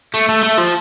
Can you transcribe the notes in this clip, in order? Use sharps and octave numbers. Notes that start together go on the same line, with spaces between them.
A3
A3
A3
F3